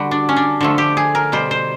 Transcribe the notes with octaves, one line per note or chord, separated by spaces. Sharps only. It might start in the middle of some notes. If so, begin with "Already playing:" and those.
Already playing: D3 G3 F#4
D4
C#4
D4
D3 F3 A3
G4
G#4
A#4
B2 G3 C5
C5